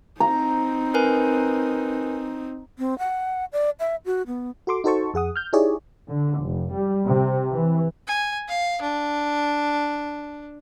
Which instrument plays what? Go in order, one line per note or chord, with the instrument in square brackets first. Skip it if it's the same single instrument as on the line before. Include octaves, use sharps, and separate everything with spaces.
[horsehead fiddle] C4 D#4 [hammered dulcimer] A#5
[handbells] A#4 B4 G#5
[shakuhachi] C4
F#5
D5
E5
F#4
B3
[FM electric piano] F#4 A4 C6 D6
D#4 F#4 A4 C5 A5 C#6
F2 G#4 F#5 D#6
F6 G6
D#4 E4 G4 G#4 C#5 D5
[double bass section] D3
F1
G3
C3
E3
[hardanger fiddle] G#5
F5
D4